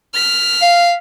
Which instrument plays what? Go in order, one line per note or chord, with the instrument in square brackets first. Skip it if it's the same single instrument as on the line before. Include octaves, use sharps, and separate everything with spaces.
[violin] F6 B6
[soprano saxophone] F5